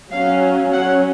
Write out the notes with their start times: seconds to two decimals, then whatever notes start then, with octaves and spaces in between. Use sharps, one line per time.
0.11 F#3 C#4 F5
0.72 F#3 C#4 F#5